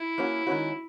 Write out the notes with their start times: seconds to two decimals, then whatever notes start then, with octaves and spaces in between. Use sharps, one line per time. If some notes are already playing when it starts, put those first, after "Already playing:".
Already playing: E4
0.18 A#3 C#4 F#4
0.47 D#3 G#3 C#4 F#4